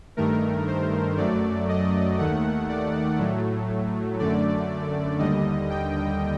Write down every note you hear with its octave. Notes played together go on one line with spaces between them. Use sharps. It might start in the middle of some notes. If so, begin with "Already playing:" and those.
G2 D#3 A3 A#4
C5
F#2 F#3 A3 D5
D#5
D#2 D#3 A3 F#5
D5
A2 F#3 A3
F#2 D3 A3 D5
D#2 D3 G3 D#5
G5